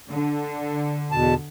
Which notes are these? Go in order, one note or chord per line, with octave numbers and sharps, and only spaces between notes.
D3
E2 B2 A5